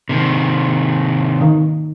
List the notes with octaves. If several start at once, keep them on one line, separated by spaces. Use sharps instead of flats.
C3 D#3
D#3